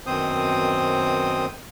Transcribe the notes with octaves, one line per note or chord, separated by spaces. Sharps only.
F#2 B2 D#3 C4 C5 D#6